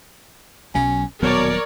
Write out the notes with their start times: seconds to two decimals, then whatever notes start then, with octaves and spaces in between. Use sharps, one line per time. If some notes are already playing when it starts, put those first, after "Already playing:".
0.75 B1 F#3 C#4
1.22 D#1 B2 F#3 B3 A#4 C#5 D5